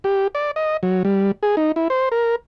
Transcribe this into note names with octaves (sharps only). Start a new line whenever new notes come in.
G4
D5
D#5
F#3
G3
G#4
D#4
E4
C5
A#4